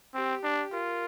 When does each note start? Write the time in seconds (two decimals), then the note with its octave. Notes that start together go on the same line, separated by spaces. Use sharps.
0.14 C4 G4
0.43 D4
0.72 F4 A#4